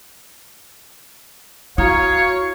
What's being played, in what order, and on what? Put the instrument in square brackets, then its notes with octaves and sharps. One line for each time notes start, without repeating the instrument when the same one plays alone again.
[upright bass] E4 [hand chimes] F#4 A#5 D#6 [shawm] C#5 [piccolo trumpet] F5